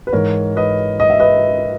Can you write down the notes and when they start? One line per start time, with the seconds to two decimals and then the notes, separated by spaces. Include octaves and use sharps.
0.07 B4
0.13 G#2 E3 A#4 C#5
0.56 B4 D#5
1.00 D#5
1.10 E5
1.20 B4 D#5